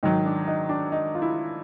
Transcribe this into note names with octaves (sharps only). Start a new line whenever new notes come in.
G#2 D#3 F#3 D#4
D4
D#4
D4
D#4
F4
E4